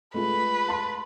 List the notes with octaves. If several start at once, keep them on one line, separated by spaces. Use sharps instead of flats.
G#3 A3 F4 B4
A5 C6